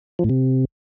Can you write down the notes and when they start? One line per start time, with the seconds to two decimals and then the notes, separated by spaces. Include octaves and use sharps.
0.19 F3
0.24 A2
0.29 C3